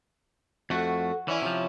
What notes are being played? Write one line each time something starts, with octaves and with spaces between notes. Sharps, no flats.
F2 A3 F#4 A4
E3 C#4 E4 D5
C3 F3 F4